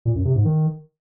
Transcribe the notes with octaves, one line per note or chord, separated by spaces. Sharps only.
A#2
F#2
C3
G#2
D#3